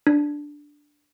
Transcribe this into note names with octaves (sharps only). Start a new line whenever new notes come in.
D4